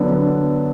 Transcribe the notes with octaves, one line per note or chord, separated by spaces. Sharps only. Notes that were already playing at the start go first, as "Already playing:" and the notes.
Already playing: D3 F#3 B3 D4 A4